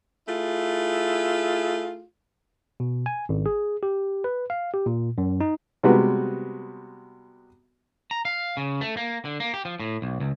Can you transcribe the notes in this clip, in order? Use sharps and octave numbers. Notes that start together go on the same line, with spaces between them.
A3 E4 F4 G#4
B2
G#5
G#1
G#4
G4
B4
F5
G4
A#2
F#2
D#4
C3 G3 G#3 B3 F#4 B4
A#5
F5
C#3
A3
A#3
D3
A#3
G4
F3
A2
B1
C#2